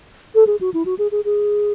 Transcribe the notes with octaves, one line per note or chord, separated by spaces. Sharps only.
A4
G#4
F#4
E4
F#4
G#4
G#4
G#4